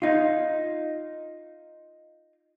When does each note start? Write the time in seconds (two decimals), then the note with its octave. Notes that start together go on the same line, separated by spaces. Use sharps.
0.02 D#4 F4